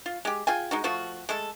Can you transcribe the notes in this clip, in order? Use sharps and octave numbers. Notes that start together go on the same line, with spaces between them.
F4
G#3 G4
F4 G#4 G5 G#5
G#3 D#4 F#4
F3 A3 F4 F#4
G#3 A3 A4